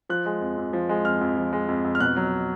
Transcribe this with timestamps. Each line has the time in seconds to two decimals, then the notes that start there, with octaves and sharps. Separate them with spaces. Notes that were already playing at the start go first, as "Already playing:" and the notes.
0.09 F3 F#6
0.26 G#3
0.41 F2
0.58 F2
0.73 F3
0.89 G#3
1.05 F2 F6
1.21 F2
1.37 F3
1.53 G#3
1.68 F2
1.84 F2
1.95 F6
2.00 B2 F#6
2.17 F#3